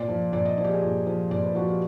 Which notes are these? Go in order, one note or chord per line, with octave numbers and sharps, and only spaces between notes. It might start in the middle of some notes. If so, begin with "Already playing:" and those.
Already playing: A#2 D5
F3
A#2 D5
D#5
F3 D5
G4
G#4
A#2
F3
A#2 D5
B4
F3 F#4
G4